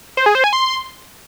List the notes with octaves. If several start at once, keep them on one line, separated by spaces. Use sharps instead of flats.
C5
G#4
C5
G#5
C6